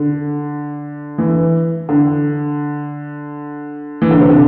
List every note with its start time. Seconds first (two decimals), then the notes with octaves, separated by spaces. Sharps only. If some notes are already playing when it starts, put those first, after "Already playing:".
Already playing: D3
1.18 E3
1.89 D3
4.02 E3
4.11 D3
4.20 C3
4.30 D3